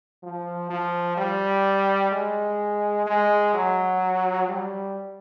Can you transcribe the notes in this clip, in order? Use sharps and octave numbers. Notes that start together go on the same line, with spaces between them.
F3
F3
G3
G#3
G#3
F#3
G3